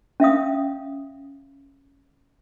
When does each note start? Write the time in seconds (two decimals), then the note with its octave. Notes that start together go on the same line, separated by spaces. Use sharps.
0.20 C#4 E5 F5 D#6